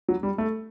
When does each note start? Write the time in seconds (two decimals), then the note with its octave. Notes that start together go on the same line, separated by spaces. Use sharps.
0.08 F#3
0.23 G3
0.38 A3